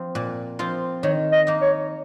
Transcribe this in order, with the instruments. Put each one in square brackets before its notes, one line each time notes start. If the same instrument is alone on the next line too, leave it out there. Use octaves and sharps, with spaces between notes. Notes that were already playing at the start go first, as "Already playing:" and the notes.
Already playing: [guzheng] F3 C4 F4
A#2
F3 C4 F4
[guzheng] D#3 [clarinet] C#5
[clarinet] D#5
[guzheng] A#3 D#4
[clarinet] C#5